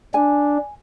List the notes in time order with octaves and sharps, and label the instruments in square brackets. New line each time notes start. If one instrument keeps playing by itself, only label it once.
[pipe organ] D4 [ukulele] G#5